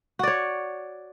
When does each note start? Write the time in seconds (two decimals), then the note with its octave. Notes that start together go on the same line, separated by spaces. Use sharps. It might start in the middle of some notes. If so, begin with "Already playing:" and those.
0.19 F#4
0.23 D5
0.27 C#5